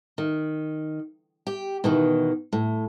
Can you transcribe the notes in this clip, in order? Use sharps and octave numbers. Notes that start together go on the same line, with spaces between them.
D#3
G4
B2 D#3 E3
A2